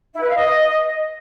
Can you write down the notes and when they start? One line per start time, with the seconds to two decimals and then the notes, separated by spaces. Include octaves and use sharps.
0.14 E4
0.21 B4
0.28 F5
0.35 D#5